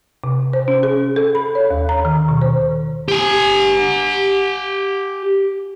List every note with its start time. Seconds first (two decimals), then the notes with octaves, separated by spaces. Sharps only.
0.24 C3
0.53 C5
0.68 C#4
0.83 G#4
1.16 A4
1.35 B5
1.55 C#5
1.70 D#2
1.89 A#5
2.05 D#3
2.28 B2
2.42 C5
3.08 G4 G#5